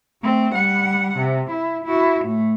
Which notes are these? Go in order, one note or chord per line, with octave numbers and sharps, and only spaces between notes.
A3 C4
G3 F#5
C3
E4
E4 F#4
A2 A3